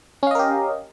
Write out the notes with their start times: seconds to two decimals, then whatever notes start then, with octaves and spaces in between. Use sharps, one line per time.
0.23 C#4
0.27 F5
0.31 D#5
0.35 A#4
0.39 G4